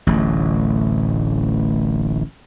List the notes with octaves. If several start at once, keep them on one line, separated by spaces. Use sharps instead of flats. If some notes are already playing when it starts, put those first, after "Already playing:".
D1 A1